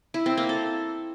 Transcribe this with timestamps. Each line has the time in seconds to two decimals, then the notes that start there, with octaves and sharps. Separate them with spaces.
0.14 E4
0.26 C4
0.37 A#3
0.49 A4